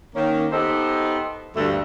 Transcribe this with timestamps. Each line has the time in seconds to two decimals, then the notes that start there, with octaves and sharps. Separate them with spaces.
0.15 D#3 A#3 C#4
0.52 B3 D#4 G4 A4 C5 D#5
1.56 D2 G2 A3